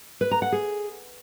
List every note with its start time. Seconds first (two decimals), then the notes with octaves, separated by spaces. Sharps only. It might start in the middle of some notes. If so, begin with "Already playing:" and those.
0.21 B4
0.31 A#5
0.42 F#5
0.52 G#4